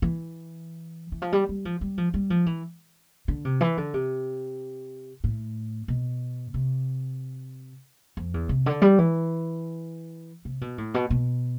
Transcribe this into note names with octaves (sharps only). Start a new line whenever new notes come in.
E3
E3
F3
G3
G3
F3
G3
F3
G3
F3
E3
D3
C3
E3
D3
C3
A2
B2
C3
F2
E2
C3
D3
G3
E3
C3
B2
A2
B2
B2